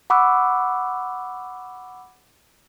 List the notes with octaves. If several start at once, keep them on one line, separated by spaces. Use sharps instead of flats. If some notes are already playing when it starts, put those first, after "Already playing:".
F#5 B5 C#6 D6 E6 F#6